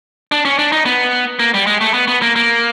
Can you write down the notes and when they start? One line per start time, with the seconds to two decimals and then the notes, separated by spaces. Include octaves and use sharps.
0.32 D4
0.45 C#4
0.59 D4
0.72 D#4
0.86 B3
1.39 A#3
1.54 G3
1.67 G#3
1.81 A3
1.94 B3
2.08 B3
2.22 A#3
2.36 A#3